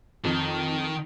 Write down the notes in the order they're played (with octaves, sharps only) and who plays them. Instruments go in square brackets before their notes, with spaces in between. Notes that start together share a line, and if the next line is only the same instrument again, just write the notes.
[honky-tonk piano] F2 [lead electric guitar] D#3